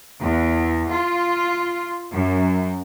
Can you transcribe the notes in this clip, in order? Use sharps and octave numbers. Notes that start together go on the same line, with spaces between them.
E2
F4
F#2